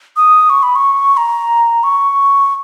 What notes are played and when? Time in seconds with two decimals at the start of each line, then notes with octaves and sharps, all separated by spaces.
0.17 D#6
0.50 C#6
0.63 B5
0.76 C#6
1.17 A#5
1.84 C#6